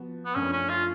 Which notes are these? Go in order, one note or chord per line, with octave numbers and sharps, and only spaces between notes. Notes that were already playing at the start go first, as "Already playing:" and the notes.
Already playing: F3 B3 F#4
B3
F#2 F3 A3 C#4 D4
C#4
F4